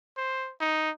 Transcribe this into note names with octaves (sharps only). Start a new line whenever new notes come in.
C5
D#4